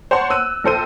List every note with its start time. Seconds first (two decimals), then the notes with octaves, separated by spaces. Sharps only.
0.11 C5 C#5 F#5 A5 C6
0.30 E6 F#6 D#7
0.64 A#1 A4 C5 D#7